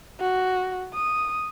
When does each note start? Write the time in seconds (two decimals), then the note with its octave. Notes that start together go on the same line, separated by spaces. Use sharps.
0.20 F#4
0.93 D#6